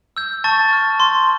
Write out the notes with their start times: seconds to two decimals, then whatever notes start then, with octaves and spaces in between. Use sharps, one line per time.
0.17 E6 G6
0.44 A5 C#6 A6
0.73 F6
1.00 C6